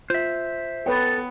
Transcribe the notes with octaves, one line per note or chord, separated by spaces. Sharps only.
F4 C5 E5
B3 A4 B4 C#5 G5